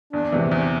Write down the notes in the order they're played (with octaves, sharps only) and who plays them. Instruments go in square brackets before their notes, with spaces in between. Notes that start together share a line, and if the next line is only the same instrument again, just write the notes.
[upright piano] E2 [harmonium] D4
[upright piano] C3 E3
E2